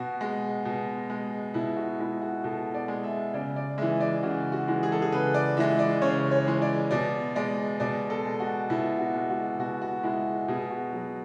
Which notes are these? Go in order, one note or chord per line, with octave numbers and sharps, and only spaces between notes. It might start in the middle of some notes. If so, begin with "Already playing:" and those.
Already playing: B2 F#4
G#3
B2
G#3
B2 E4
F#4
G#3 E4
F#4
B2 A4
D5
G#3
E5
C#3 D5
D5
E3 G#3 E5
D5
C#3 F#4
F#4
E3 G#3
G#4
A4
G#4
C#3 B4
D5
E3 G#3 E5
D5
C#3 C#5
C#5
E3 G#3
D5
B2 D5
G#3 D5
B2 D5
A4
G#3
F#4
B2 E4
F#4
G#3
F#4
B2 F#4
F#4
G#3 E4
B2 G#4
F#4
F#3